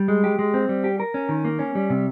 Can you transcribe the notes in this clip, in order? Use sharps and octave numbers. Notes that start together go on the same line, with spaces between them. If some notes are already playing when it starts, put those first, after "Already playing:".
Already playing: G3
G#3
G4
G#3
C4
G3
G4
A#4
C#4
D#3
A#3
C#4
G3
C3